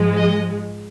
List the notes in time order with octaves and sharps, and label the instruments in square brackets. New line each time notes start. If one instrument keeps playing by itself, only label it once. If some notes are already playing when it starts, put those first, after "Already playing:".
Already playing: [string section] G#2 F3 G#3
D#5